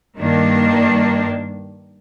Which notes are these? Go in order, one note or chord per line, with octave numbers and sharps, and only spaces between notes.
G2 D#3 A#3 D4